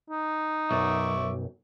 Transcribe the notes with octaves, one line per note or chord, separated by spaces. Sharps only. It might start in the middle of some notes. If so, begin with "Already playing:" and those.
D#4
B1 F#2 E5 C#6 D6